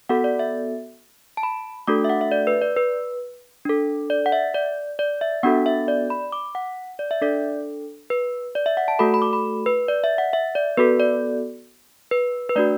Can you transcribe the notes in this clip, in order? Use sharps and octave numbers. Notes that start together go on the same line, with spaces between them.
B3 F#4 A4 F#5
D5
E5
A5
B5
A3 D4 F#4 A4 D6
E5
F#5
E5
D5
B4
D5
B4
D4 A4
D5
F#5
E5
D5
D5
E5
B3 D4 F#4 A4 F#5
E5
D5
B5
D6
F#5
D5
E5
D4 A4 D5
B4
D5
E5
F#5
A5
A3 F#4 A4 B5
B5
D6
B5
B4
D5
E5
F#5
E5
D5
B3 F#4 A4 B4
D5
B4
B4
A3 D4 F#4 D5